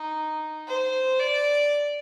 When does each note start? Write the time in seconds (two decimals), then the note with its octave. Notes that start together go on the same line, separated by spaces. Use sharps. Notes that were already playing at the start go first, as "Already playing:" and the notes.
Already playing: D#4
0.68 C5
1.19 D5